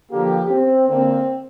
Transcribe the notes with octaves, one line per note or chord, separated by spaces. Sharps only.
D3 F3 A#3 G4
C4
D3 A#3 C4